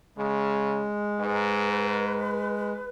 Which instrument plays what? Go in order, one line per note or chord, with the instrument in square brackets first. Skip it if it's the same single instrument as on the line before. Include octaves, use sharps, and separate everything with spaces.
[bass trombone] C#3 [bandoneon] G#3
[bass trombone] G#2 [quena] B4